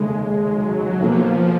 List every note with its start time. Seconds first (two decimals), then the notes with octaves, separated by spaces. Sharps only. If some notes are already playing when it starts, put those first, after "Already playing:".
Already playing: F1 D#2 C#3 G#3
0.50 F#3
1.00 B1 B2 F3 A#3